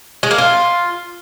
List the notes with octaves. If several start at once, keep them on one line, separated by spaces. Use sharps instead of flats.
G#3
A#3
F4